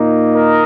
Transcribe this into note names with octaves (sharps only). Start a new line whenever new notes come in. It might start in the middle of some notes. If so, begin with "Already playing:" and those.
Already playing: A#2 A#3 D#4
A#4 D#5